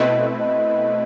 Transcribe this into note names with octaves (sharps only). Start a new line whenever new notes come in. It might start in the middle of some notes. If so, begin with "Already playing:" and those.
Already playing: B2 A3 C4 E4 B4 D#5
D#5